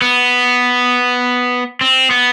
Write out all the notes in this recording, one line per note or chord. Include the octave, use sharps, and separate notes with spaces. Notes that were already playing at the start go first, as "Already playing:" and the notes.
B3
C4
B3